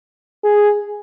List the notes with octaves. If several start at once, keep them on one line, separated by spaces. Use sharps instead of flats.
G#4